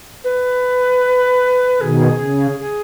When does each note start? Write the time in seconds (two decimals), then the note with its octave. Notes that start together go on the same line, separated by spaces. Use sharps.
0.23 B4
1.80 B2 D#3 G#4
2.19 C#3
2.59 G#4